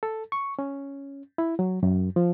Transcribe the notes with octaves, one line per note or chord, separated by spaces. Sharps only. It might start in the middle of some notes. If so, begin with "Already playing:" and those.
A4
C#6
C#4
E4
F#3
F#2
F3